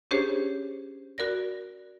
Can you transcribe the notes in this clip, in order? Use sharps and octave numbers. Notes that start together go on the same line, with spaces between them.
C#4 D4 G4 G#4 C5 C#5
F#4 A#4 D5 A#6